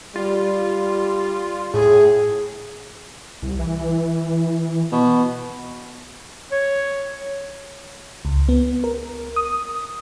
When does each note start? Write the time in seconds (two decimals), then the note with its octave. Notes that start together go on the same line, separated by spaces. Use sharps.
0.16 G3 F4
1.74 A2 G#4
3.42 C2
3.59 E3
4.92 B2
6.52 C#5
8.25 C#2
8.49 B3
8.84 A#4
9.36 D#6